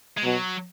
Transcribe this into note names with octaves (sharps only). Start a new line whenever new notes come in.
G#3
B2 F#3